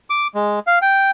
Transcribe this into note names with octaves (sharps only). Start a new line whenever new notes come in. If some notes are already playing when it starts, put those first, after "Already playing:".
D6
G#3
F5
G5